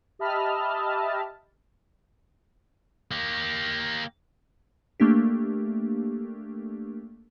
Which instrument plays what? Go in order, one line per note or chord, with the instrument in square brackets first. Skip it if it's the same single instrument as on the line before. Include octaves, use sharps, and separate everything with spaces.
[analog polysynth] G4 D#5 E5 A5 B5 F6
[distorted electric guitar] A#3 G4
[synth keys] A3 A#3 D4 G4